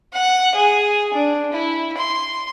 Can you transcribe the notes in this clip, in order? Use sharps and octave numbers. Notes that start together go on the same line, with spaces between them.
F#5
G#4
D4
E4
C6